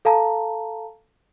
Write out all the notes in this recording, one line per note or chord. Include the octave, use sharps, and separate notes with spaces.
A4 F5 A5 A#5